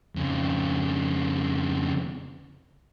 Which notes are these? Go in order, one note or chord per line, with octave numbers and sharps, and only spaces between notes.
F2 C#3